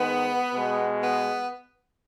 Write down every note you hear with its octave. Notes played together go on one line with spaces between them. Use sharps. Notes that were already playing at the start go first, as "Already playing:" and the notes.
Already playing: G#2 D#3 G#3 B3
B2 G#3
B3